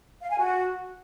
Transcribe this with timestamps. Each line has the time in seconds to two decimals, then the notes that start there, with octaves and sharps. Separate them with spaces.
0.22 F5
0.30 G#5
0.39 F#4